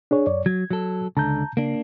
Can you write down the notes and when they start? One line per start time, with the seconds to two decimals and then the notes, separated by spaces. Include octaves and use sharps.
0.11 D4 G#4 C#5
0.27 F#2 C#5 D5
0.46 F#3 G#6
0.71 F#3 A4
1.17 C#2 D3 A5 A#5 G6
1.57 C#3 A#3 D4